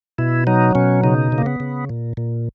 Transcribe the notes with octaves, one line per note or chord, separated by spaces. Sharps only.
B2 E4
F#3 D#4
B2 C#4
C#3 D#4
C#3
A#3
B3
C#3
A#2
A#2